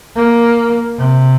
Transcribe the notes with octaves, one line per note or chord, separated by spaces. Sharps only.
A#3
C3